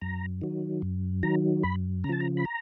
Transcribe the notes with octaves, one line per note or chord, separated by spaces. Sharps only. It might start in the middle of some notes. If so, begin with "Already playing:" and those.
F#2 A#5
D#3 F#3
F#2
D#3 F#3 A#5
F#2 B5
C#3 A#5
F3 A5
A#5
B5
A#5